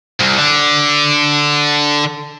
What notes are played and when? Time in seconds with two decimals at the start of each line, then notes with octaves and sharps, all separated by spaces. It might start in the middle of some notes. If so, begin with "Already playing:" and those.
0.20 C2
0.38 D3